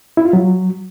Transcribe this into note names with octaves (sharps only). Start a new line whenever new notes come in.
E4
F4
F#3